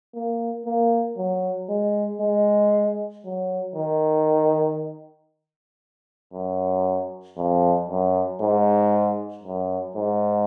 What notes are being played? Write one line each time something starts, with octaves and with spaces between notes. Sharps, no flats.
A#3
A#3
F#3
G#3
G#3
F#3
D#3
F#2
F2
F#2
G#2
F#2
G#2